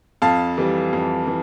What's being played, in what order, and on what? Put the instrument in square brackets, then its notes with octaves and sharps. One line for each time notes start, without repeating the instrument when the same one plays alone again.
[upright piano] F2 F5 A5
E3 G3
F2
E3